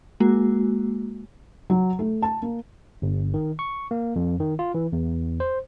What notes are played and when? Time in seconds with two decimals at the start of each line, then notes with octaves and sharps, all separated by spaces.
0.20 G#3 A#3 F#4
1.70 F#3
1.99 A3
2.22 A5
2.42 A#3
3.02 G1
3.34 D#3
3.59 C#6
3.91 A#3
4.16 F2
4.40 D#3
4.59 F4
4.74 E3
4.93 E2
5.40 C5